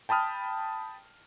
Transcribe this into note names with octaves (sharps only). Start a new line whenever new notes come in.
G5 A5 B5 D#6 F6